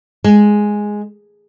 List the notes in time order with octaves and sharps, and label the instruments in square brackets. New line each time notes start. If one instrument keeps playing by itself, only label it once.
[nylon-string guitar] G#3